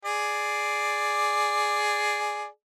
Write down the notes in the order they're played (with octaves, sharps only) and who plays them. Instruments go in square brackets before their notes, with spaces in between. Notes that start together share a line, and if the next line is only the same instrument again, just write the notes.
[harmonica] G#4 D5